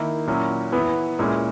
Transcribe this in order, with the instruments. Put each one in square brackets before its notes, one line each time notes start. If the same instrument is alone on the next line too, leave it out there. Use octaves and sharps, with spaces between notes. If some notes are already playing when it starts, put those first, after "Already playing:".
Already playing: [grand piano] D#3 A#3 E4
A#2 F#3 C#4 E4
E3 B3 E4
A#2 G#3 C#4 E4